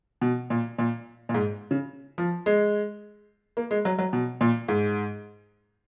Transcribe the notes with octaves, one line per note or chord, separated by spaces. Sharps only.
B2
A#2
A#2
A#2
G#2
C#3
F3
G#3
A#3
G#3
F#3
F#3
B2
A#2
G#2